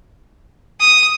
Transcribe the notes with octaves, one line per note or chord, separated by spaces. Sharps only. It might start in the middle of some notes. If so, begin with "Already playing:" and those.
D#6